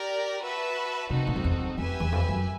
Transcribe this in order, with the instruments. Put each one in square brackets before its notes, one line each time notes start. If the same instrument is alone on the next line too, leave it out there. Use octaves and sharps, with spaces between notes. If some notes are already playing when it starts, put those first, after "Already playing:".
Already playing: [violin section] G4 A#4 D5
F#4 B4 E5 A5
[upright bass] C3 [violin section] C4 D#4 F#4 A4
[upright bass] A#2
F2
E2
E2
[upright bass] F2 [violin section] G4 B4 E5 G#5
[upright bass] E2
F2
F#2